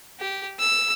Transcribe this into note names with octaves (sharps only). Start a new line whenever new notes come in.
G4
E6